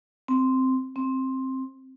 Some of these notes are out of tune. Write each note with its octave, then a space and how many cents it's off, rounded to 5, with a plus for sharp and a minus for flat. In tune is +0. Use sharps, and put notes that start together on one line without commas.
C4 -5
C4 +10